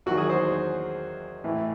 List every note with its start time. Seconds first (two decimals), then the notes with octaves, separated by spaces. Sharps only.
0.06 E2 D#3 F#3 F#4
0.17 G#4
0.30 C5
1.44 A2 E3